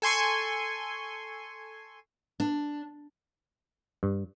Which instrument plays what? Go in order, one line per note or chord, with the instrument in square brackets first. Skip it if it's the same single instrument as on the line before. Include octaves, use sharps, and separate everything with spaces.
[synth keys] A4 G#5 C6 C#6
[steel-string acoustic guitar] D4
[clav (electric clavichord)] G2